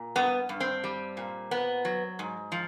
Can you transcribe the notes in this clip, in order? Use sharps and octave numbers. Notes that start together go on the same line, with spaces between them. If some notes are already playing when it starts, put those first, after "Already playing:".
Already playing: A#2
G2 B3
G2
C4
G3
A#2
B3
F#3
G#2
F3